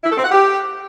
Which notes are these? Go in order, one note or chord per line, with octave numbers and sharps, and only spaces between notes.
E4
A4
C4
F#5
G4